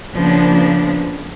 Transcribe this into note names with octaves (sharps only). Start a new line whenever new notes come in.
C#3 F3 A#3 B3 D4